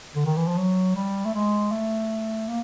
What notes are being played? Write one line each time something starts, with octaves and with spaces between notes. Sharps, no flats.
D3
D#3
E3
F3
F#3
G3
A3
G#3
A3
A#3